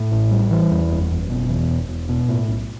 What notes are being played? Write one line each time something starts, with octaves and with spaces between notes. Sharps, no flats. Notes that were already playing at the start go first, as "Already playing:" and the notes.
Already playing: A2
A1
G3
E3
E2
F#1
F#1
B2
E2
E1
E1
B2
A2
B1